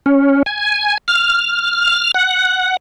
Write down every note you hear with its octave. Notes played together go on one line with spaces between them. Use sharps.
C#4
G#5
F6
F#5